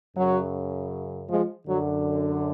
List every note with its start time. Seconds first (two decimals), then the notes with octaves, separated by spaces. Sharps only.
0.16 F#2 C#3 F#3
1.29 F3 G#3
1.66 F#2 D3 F#3